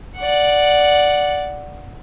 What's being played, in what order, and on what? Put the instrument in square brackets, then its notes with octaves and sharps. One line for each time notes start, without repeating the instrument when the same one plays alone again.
[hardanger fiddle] D5 F#5